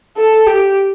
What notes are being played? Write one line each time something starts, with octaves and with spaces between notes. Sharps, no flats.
A4
G4